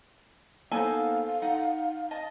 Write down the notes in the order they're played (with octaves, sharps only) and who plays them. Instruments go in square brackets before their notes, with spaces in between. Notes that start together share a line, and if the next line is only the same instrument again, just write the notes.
[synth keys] A#3 B3 D#4 [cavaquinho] A4 [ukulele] C5 G#5 [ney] F5
[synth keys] D#4 [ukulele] F#5
[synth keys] D#5 [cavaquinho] A5